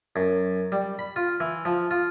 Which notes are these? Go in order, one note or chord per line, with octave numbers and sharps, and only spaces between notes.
F#2
G3
B5
F4
E3
F3
F4